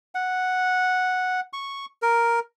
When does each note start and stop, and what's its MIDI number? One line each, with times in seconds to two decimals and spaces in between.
0.15 1.40 78
1.53 1.86 85
2.02 2.39 70